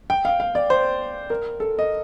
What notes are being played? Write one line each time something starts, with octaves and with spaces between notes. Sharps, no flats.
G5
F5
F5
D5
C5
A#4
A4
D#5